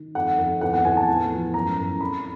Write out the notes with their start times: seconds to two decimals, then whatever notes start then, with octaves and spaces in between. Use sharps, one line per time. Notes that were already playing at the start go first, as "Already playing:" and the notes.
Already playing: D#3
0.15 F2 F#5
0.38 F2
0.61 E2 F#5
0.74 F#5
0.85 E2 G#5
0.97 A5
1.08 A2
1.32 F3
1.54 F#2 A#5
1.78 F#2
2.01 F2 B5